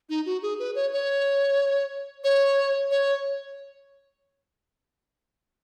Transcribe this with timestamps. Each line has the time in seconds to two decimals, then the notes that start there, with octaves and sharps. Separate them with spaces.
0.10 D#4
0.26 F#4
0.42 G#4
0.59 B4
0.75 C#5
0.93 C#5
2.24 C#5
2.91 C#5